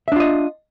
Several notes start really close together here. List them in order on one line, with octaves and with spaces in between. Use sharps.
E5 D4 F4 D#5